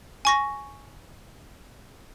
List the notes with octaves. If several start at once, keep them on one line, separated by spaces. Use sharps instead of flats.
G#5 C#6 A#6